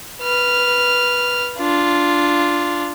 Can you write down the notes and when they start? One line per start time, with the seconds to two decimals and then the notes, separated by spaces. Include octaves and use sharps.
0.21 B4 F6
1.58 D4 F4